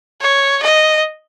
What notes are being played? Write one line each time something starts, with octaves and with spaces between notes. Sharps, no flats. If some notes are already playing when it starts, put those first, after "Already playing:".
C#5
D#5